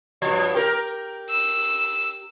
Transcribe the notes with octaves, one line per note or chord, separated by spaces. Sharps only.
G2 F3
G4 A#4
E6